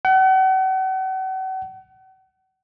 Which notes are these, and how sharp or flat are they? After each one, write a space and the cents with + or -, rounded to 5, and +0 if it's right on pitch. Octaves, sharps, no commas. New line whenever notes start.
F#5 +40